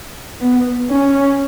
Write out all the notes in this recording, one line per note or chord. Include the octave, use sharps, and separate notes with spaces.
B3
C#4